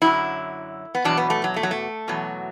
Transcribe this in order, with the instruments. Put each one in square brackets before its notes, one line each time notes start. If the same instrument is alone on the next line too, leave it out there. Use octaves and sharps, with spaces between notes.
[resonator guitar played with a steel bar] F#2 D3 F#3 E4
B3
E2 B2 F#3 D4
B3
A3
F#3
A3
F#3
A3
E2 B2 F#3